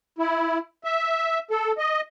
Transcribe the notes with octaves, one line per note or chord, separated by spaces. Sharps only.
E4
E5
A4
D#5